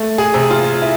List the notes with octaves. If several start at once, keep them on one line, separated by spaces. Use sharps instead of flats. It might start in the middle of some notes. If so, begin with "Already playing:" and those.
Already playing: A3
G#4
C3
F4
E4